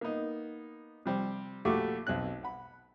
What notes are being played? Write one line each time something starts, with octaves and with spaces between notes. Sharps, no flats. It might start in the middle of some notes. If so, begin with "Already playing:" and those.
A#3 B3 D#4
C3 F3 G3 G4 C5
A#1 A3 F#4 G4 C#6 D6
B1 C4 F#6
F#5 B5